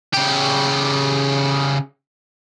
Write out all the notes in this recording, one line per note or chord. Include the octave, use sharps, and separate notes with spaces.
C#3 G4